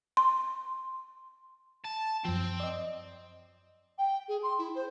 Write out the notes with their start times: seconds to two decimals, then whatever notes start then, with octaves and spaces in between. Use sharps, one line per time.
0.17 C6
1.85 A5
2.25 F#2 F3 C4
2.60 D5 D#5
3.98 G5
4.28 G#4
4.43 C6
4.58 E4
4.75 C5